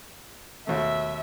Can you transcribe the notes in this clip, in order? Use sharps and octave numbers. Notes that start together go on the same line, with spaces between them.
D#2 B2 A3 E5